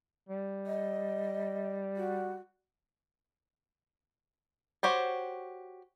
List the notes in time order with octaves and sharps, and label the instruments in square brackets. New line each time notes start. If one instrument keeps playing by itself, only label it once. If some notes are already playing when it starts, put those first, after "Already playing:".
[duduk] G3
[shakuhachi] D#5
F#4
[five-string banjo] F#4 G4 C5 C#5